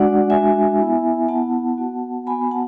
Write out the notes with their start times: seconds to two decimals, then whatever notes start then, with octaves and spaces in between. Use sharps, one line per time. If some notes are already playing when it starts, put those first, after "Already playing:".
Already playing: G#3 D4 F#4 D5 F#5
0.30 G#3 D4 F#4 E5 G#5
0.78 B3 E4
1.28 B3 E4 F#5 A5
1.78 B3 F#4
2.27 B3 F#4 G#5 B5
2.51 F#5 A5